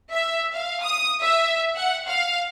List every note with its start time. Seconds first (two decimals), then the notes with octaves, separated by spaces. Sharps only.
0.11 E5
0.53 F5
0.82 D#6
1.21 E5
1.75 F#5
2.06 F5